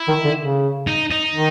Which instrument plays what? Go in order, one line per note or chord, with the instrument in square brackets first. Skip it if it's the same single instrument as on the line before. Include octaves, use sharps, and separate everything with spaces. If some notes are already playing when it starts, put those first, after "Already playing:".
Already playing: [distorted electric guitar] E4
[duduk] D#3
D3
C#3
[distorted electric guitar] D#4
D#4
[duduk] D#3